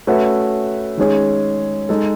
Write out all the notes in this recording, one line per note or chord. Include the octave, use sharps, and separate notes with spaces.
A3 C#4 F#4 B4 E5
D#3 G#3 C#4 G#4
G#3 D#4 A4